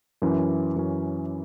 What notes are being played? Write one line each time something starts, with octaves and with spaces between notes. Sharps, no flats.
F#2 E3 C#4
F#2 E3 C#4